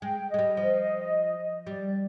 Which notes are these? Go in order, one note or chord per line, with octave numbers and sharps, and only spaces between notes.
G#3 G5
G#3 D#5
G3
F3
G3 D5